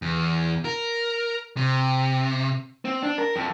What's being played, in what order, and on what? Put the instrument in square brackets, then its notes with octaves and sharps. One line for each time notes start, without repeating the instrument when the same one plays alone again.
[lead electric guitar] E2
A#4
C3
C4
D4
A#4
F2